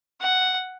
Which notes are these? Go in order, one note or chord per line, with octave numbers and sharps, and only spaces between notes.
F#5